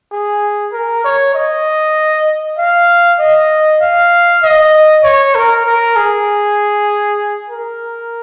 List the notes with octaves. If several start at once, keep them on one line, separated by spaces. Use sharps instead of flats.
G#4
A#4
C#5
D#5
F5
D#5
F5
D#5
C#5
A#4
A#4
G#4
A#4